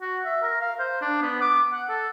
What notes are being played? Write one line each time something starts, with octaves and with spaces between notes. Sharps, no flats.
F#4
E5
A#4
F5
C5
D4
B3
D6
F#5
A4